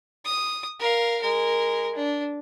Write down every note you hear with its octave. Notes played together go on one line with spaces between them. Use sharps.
D#6
A#4 F5
G#3 A#4
D4